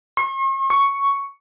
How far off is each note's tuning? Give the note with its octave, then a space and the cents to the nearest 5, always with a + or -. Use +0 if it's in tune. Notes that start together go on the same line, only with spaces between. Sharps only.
C#6 -45
C#6 +5